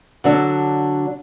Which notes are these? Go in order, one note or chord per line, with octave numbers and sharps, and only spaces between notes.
D3 F#3 D4